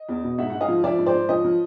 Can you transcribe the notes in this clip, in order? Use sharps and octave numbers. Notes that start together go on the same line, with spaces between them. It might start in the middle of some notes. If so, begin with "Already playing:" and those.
Already playing: D#5
E2
B2
G#2 E5 F#5
G#2 F#5
D#5 F5
F3
F3 D5 E5
G#2
C5 D5
G#2
F3 C#5 D#5
F3